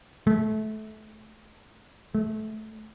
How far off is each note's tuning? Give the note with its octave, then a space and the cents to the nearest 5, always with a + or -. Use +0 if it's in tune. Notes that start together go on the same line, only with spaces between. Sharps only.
A3 -25
A3 -20